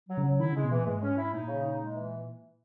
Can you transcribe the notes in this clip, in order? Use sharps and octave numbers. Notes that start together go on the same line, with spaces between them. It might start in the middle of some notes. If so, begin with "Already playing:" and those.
F#3
C#3
F#3
D#3 E4
C#3 G#3
B2
A#2 E3
G#2 G#3
C#4
E4
A#2 D#4
C#3
D#4
G#3
E3